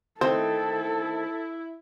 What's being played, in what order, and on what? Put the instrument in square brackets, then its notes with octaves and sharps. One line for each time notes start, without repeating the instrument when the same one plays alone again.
[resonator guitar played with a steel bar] D#3 A3 C4 [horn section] E4 [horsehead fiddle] A4 [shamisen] C5